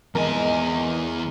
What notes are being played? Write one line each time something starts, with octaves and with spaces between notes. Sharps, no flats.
E2 G#3 A#4 G#5